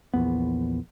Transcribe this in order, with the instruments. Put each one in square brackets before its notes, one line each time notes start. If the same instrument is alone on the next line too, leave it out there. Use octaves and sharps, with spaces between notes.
[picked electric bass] A#1 E2 B3